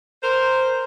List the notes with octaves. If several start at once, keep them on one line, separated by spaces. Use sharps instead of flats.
A#4 C5